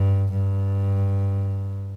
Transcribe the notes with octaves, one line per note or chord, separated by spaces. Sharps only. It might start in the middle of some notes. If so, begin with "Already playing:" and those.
Already playing: G2
G2